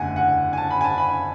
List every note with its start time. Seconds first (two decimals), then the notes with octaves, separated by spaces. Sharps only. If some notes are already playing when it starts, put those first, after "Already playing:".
Already playing: F#1 E2 D3 A3 F#5 G#5
0.16 F#5
0.53 G#5
0.57 A5
0.70 B5
0.81 G#5
0.84 A5
0.98 B5